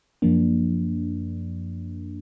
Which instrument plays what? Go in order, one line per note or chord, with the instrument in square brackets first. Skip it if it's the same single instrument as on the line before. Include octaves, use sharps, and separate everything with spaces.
[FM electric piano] F#2 F3 A#3 D4